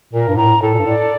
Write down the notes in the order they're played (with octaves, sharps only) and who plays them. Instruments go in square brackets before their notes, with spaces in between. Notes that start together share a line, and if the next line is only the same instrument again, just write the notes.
[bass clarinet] A#2 [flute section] A#4
[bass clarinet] G2
[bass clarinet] A2 [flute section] A#5
[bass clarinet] A2 [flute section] A4
[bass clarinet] A#2
G2
[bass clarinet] A2 [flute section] D5